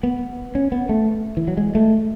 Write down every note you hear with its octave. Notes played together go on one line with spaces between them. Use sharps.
B3
C#4
B3
A3
E3
F#3
G#3
A3